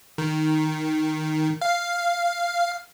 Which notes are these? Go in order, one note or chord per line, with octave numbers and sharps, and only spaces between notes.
D#3
F5